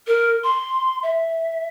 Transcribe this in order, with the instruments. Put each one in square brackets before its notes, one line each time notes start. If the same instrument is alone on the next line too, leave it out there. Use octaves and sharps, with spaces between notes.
[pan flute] A#4
C6
E5